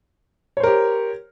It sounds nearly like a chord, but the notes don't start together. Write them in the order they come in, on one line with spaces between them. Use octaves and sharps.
C#5 C5 A#4 G4